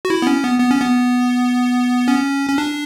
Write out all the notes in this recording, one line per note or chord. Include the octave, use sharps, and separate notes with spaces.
F#4
E4
B3
C#4
B3
B3
C#4
B3
C#4
C#4
D4